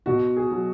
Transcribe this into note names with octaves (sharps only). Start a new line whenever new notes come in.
B2 F#4
G#4
F#3